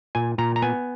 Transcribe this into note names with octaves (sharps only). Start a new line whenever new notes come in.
A#2 G#5
A#2 A#5
A#5
B3 G#5